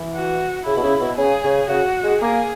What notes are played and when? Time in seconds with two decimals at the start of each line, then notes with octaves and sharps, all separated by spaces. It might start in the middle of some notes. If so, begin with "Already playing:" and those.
Already playing: E3
0.14 F#4
0.66 C#3 E4
0.76 B2
0.83 C#3
1.00 B2
1.17 C#3 G#4
1.44 C#3
1.69 C#3 F#4
2.03 G#3
2.22 A#3 G#4